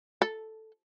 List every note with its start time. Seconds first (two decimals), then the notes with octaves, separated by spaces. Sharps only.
0.22 A4